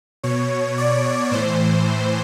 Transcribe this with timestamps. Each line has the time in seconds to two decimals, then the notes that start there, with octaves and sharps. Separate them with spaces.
0.23 B2 C#5
0.78 D5
1.31 A2 E3 C5